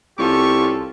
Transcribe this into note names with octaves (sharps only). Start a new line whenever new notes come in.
C2 C#4 F4 G4 A4 C#6